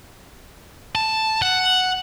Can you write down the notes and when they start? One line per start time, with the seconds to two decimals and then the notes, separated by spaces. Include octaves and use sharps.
0.95 A5
1.42 F#5